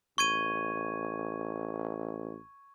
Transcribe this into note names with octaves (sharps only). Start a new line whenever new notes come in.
A1 C#6 G#6 D#7